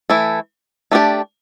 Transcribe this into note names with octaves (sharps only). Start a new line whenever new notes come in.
E3 A3 E4
A3 D4 G4 D5